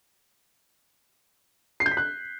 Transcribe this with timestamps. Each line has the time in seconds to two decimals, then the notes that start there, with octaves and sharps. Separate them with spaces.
1.80 C7
1.86 G6
1.91 B6
1.97 F#6